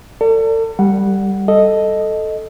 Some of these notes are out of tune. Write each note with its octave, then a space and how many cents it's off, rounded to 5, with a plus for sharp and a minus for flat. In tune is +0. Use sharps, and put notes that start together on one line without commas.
A4 +40 D5 -25
G3 +0 F#5 +0
A4 +0 D#5 +0